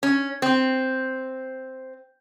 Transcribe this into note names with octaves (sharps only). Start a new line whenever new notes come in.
C#4
C4